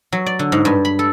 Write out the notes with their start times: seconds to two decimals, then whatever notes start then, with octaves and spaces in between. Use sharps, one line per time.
0.12 F#3
0.26 D5
0.39 D3
0.52 G#2
0.65 G2
0.85 B5
0.99 A4